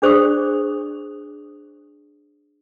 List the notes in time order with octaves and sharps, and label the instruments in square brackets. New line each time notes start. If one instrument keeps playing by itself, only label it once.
[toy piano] D4 G#4 C5 D5 C#6 D#6